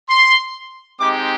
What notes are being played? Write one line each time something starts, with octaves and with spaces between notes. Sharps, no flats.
C6
G#3 C4 D#4 G4 D6